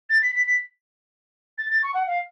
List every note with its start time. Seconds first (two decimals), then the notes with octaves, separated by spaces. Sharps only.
0.09 A6
0.22 B6
0.35 B6
0.46 B6
1.58 A6
1.70 A6
1.82 C#6
1.94 F#5
2.07 F5